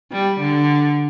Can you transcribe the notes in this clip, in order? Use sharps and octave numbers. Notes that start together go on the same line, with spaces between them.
G3
D3